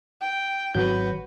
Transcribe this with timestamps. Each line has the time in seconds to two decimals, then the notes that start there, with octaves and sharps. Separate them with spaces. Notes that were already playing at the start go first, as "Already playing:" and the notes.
0.21 G5
0.75 G#1 F#3 F#4 B4 G6